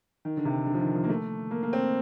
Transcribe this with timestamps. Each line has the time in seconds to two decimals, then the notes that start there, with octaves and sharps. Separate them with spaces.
0.25 D#3
0.37 D3
0.45 C3
0.66 D3
0.74 F3
0.80 D#3
0.95 F3
1.04 A#3
1.09 A3
1.51 A#3
1.63 A#3
1.73 C4